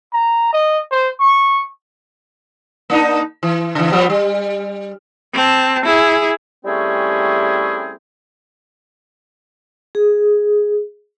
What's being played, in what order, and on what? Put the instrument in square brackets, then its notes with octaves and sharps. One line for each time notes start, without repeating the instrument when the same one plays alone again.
[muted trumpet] A#5
D#5
C5
C#6
[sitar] A#3 D4 D#4
E3
C#3 E3
F3 G3 B3
G3
[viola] C4 A5
E4 G#4
[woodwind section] G3 A3 C4 C#4 E4 G#4
[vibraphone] G#4